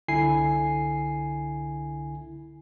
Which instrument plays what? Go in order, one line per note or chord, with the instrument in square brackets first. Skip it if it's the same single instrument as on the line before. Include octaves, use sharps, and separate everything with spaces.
[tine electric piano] C2 D3 E4 G#5 C7